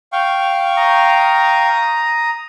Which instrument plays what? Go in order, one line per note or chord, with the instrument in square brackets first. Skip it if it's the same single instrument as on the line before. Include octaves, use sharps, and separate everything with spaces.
[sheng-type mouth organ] F5 G5 C#6
[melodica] A#5 D#6